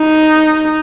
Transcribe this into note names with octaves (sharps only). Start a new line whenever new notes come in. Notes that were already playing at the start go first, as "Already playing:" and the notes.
Already playing: D#4